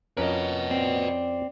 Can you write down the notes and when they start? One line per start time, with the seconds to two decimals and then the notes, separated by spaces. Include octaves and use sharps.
0.17 F2 C#4 A#4 B4 D#5
0.71 C4 D5